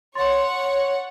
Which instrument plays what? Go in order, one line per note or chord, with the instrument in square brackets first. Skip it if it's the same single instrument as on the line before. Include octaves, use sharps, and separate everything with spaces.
[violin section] C#5 F#5 [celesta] C6 A6